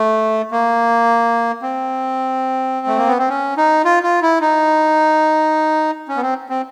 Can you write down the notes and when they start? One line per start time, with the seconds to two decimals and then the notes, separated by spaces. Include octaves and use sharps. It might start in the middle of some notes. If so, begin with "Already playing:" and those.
Already playing: A3
0.51 A#3
1.62 C4
2.87 A3
2.97 A#3
3.07 B3
3.18 C4
3.29 C#4
3.57 D#4
3.85 F4
4.03 F4
4.22 E4
4.41 D#4
6.08 C#4
6.17 B3
6.22 C4
6.49 C4